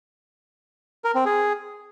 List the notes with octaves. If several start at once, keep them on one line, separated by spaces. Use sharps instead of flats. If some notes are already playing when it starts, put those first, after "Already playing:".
A#4
C4
G#4